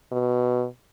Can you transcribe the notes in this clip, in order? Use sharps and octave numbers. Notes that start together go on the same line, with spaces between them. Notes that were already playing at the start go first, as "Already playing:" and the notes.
B2